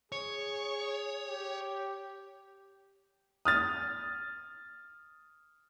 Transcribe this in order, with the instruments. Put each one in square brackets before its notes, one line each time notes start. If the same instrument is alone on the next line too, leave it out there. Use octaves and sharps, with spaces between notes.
[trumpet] G#4 [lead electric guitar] C#5
[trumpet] G4
[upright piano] D#6 F6 A6